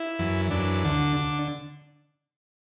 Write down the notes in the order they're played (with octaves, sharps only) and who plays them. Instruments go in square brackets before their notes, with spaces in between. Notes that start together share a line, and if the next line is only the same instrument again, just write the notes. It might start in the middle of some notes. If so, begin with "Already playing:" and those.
Already playing: [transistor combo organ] E4
F#2 E3
F#2 E3 D4
D2 D3
D3